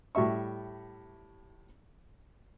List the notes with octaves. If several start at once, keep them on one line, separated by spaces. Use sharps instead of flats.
A2 G3 E5 C#6